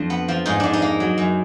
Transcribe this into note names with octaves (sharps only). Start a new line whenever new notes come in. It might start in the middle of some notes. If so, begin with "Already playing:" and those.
Already playing: F2 D4
B3
F3
G#2 D#4
G#2 D4
D#4
A#3
F#3
F#2